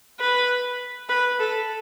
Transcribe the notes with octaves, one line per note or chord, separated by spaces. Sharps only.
B4
B4
A4